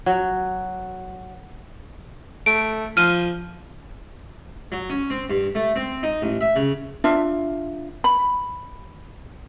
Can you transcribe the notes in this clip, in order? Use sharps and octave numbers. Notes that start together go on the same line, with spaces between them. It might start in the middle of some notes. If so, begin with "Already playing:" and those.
F#3
A3 D7
F3 F6 D#7
F#3
C#4
C4
G2
A3
C4
D#4
A1
E5
C#3
D4 F4 E5
B5